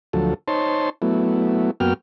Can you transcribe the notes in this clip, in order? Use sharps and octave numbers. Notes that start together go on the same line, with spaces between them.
D2 F3 F#3 A4
D#4 C5 C#5 A5 C6
F#3 A3 B3 E4
F#2 A#3 B3 F#4 G5 F6